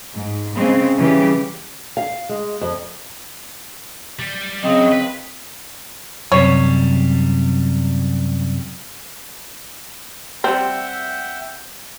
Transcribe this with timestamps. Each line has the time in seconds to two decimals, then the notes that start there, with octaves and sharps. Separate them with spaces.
0.14 G#2
0.55 C#3 G#3 A#3 C4
0.97 C#3 E3 G3 G4
1.97 F5
2.29 G#3
2.61 F2
4.19 G3
4.64 C#3 F#3 C4 D#5
4.92 B4
6.32 F#2 C3 G3 C#5
10.44 G3 C4 E5 F#5 G5